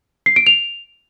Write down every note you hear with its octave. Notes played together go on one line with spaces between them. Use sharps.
C7
D7
F7